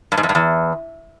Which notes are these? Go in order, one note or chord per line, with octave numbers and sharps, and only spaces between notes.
G2
G#2
F2
G2
E2